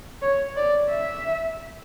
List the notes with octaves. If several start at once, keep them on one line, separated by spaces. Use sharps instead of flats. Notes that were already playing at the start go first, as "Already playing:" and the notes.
C#5
D5
E5